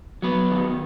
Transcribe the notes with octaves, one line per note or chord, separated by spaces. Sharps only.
F#3 B3
D#3